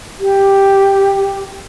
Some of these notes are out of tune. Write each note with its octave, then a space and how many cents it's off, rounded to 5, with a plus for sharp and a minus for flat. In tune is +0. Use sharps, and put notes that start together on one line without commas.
G4 +5